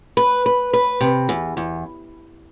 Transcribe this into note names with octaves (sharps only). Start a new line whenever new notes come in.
B4
B4
B4
C3
E2
E2